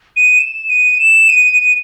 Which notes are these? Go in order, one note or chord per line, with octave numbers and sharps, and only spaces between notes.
D#7
E7
D#7
E7
D#7